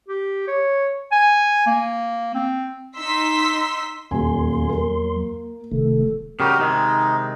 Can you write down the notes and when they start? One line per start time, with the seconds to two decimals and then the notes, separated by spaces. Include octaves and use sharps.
0.08 G4
0.48 C#5
1.12 G#5
1.67 A#3
2.34 C4
2.97 D#4 C6 E6 B6
4.11 D#1 E2 F#3 A#3 G#5 C6
4.69 A#3 A#4
5.72 D1 C3 D#3 A3 A4
6.40 C#3 G3 D#4 F#4 G4 A#4
6.59 C3 D#3 G#3 D#4